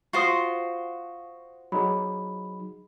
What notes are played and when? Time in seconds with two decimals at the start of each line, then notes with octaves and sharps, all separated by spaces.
0.13 F4 F#4 C5 C#6 D#6
1.72 F#3 D#4 G#4 B5